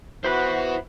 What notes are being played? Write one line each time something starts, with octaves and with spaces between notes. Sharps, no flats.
B3 E4 F#4 B4 C5 B5 F#6